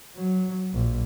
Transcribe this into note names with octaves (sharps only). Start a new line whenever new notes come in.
F#3
A#1